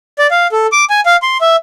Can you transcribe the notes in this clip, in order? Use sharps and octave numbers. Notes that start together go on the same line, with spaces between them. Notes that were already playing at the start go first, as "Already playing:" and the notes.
D5
F5
A4
D6
G#5
F5
C6
E5